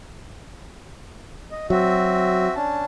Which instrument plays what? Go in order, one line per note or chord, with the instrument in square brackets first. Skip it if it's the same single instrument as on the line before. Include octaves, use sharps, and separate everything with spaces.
[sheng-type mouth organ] D#5
[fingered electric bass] F#3 [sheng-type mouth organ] C4 F#4 E5
[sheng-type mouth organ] C#4 D4 A5